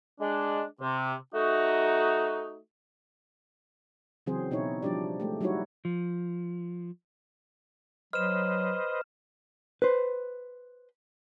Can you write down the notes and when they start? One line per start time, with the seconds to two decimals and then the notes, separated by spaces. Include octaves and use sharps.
0.20 G#3 D4
0.81 C3
1.34 A3 D#4 F#4
4.26 C#3 E3 F#3 C4 G#4 C5
4.51 B2 D#4 E4 C#5
4.83 F3 G3 D4 G4 D5
5.20 G#3 A3 G4
5.41 F#3 G3 D#4 E4 F#4 C#5
5.85 F3
8.13 F#3 B4 C5 D#5 F6 E7
9.82 B4 C5